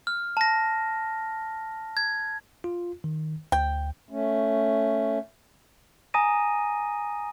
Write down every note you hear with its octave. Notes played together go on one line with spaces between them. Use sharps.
F6
A5 A#6
G#6
F4
D#3
D2 G5
A3 C#4
G#5 A#5 D#6 A#6 D#7